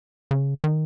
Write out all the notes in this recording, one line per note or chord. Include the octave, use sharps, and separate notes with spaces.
C#3
D#3